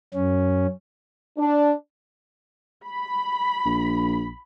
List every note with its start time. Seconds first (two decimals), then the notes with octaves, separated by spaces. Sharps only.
0.14 F#2 C#4
1.37 D4
2.87 B5
3.66 A#1